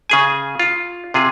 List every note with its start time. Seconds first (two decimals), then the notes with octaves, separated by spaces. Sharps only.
0.10 C#3 G#4 G#5
0.59 F4
1.14 C3 F4 G#4